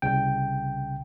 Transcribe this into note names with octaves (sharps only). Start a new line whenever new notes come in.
C2 C#3 G5